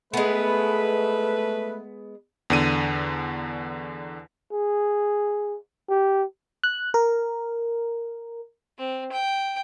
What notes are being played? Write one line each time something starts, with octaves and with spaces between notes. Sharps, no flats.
G#3 A3 B3 B4
E2 D3 D#7
G#4
G4
F#6
A#4
C4
G5